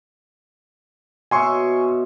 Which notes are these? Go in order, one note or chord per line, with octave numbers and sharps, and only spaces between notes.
B2 C#5 E5 G#5 C6 C#6